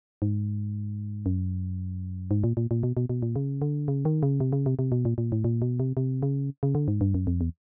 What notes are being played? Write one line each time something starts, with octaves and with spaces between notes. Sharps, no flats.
G#2
F#2
G#2
A#2
A#2
A#2
B2
B2
B2
A#2
C#3
D3
C#3
D#3
C#3
C3
C#3
C3
C3
B2
A#2
A#2
A2
A#2
B2
C3
C3
C#3
C#3
D3
G#2
G2
F#2
F2
E2